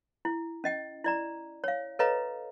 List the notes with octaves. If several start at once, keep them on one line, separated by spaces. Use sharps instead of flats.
E4
C#4 D#5 G5
E4 D5 A#5
C#5 F5
A4 B4 C#5 D#5 F5 A#5